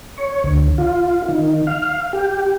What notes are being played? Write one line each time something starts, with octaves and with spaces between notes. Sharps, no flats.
C#5
D2
F4
D#3
F5
G4